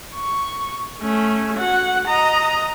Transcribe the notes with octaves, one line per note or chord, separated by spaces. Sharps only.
C#6
A3 C#4
F#4 F#5
D#5 A#5